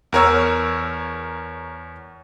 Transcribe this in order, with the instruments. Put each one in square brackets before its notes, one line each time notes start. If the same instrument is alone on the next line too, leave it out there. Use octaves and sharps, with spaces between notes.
[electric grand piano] E2 A#4 C#5 E6